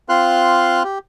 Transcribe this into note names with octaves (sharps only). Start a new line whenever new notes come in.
C4 F4 F5 C6 F#6
G4